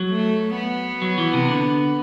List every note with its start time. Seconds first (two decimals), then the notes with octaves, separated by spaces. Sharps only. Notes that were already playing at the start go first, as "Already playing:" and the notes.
Already playing: F#3
0.09 A3
0.55 B3
1.02 F#3
1.18 E3
1.34 C3
1.49 D3